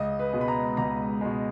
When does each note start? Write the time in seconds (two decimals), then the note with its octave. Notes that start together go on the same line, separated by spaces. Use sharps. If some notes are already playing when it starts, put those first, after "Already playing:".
Already playing: C#2 D#5
0.19 B4
0.33 B2 G#3
0.41 B5
0.48 A#5
0.77 C#2 A#5
1.21 B2 G#3